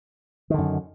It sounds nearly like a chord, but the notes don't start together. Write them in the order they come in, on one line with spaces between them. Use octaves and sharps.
D#3 D3 F#2